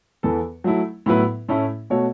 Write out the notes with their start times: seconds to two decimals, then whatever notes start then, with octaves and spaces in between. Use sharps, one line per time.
0.23 E2 E3 B3 A4
0.64 F#3 A3 E4
1.06 A2 F#3 B3 E4 B4
1.49 A2 A3 C#4 E4
1.90 B2 A3 F#4 C#5